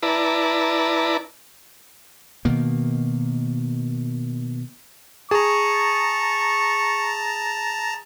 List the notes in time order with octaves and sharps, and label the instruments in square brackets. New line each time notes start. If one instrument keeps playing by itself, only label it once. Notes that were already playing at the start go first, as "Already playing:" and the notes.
[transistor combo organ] E4 B4 D5 A5 A#5
[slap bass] B2 D#3 A#3
[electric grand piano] G#4 [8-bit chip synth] A5 A#5 [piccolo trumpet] C#6